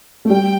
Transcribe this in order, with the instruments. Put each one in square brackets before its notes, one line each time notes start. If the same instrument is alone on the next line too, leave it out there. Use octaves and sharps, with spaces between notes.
[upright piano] A3
[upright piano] G3 [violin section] G5